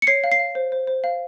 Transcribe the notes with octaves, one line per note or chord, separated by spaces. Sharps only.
C#7
C#5 C7
F5
C7
F5
C5
C5
C5
F5